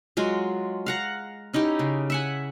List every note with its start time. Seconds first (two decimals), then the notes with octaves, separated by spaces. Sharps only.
0.17 F#3 G#3 F4 F#4
0.86 F5 F#5 A#5
1.54 C#4 D#4 E4 G4
1.79 C#3
2.10 E5 F#5 G#5